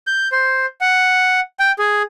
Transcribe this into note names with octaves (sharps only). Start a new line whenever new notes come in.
G6
C5
F#5
G5
G#4